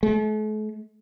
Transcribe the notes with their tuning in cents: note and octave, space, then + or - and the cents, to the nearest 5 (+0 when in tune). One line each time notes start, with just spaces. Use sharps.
A3 -45